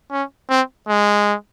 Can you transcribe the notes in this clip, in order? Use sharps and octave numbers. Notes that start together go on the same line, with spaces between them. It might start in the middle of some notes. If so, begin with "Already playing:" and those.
C#4
C4
G#3